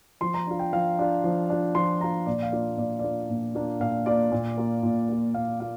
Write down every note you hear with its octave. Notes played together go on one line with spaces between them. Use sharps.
F3 C6
A#5
D4 F4
G5
F3 F5
D4 F4
F3
D4 F4
F3 C6
D4 F4 A#5
A#2 D5
F5
A#3 D4 F4 D5
A#2 D5
A#3 D4 F4 D5
A#2
A#3 D4 F4
A#2 F5
A#3 D4 F4 D5
A#2
A#3 F4
A#2
A#3 F4
A#2 F5
A#3 F4 F5